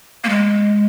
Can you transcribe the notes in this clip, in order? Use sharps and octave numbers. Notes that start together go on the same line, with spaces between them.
A#3
G#3